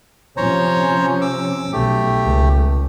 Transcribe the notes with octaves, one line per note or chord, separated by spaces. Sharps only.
C3 F3 C#4 C5 C#5 A#5
D6 E6
B1 A3 G4
C#2